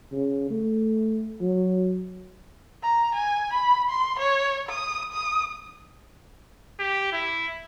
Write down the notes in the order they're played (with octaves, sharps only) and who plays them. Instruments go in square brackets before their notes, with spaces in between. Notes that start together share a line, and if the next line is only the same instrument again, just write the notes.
[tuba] C#3
A3
F#3
[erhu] A#5
G#5
B5
C6
C#5
D#6
D#6
[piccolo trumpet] G4
E4